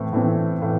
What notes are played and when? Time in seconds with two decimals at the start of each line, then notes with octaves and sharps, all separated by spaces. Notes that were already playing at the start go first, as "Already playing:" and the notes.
Already playing: A2 E3 A3 C4
0.13 A2 E3 A3 C4
0.62 A2 E3